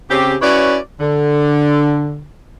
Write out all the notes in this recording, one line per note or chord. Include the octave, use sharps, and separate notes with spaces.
C#3 C4 C#4 G4
C#4 E4 F#4 B4 C#5 D5
D3